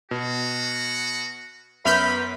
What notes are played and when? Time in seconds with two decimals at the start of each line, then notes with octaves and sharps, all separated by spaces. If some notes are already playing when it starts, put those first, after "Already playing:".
0.11 B2 F#4
1.85 F#2 B3 B4 E5 B5 F6 G6